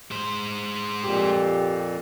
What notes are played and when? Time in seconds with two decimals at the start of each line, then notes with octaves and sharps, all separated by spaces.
0.11 G#3 C5
1.03 F2 A#2 G4